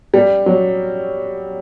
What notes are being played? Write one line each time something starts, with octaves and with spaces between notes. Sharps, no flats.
G3
F#3